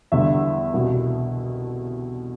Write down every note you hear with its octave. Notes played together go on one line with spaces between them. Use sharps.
E2 D3 G3 E5
C2 B2 G3